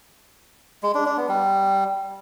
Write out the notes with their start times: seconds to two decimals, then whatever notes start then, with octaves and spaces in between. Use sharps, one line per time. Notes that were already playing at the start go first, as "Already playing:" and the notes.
0.83 G#3
0.94 D4
1.06 D4
1.17 B3
1.29 G3